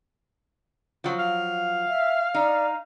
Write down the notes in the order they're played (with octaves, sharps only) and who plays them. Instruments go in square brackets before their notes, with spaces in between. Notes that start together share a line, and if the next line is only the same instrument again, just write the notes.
[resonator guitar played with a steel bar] F3 F#3
[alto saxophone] F5
[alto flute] E5
[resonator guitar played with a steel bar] D#4 [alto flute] D5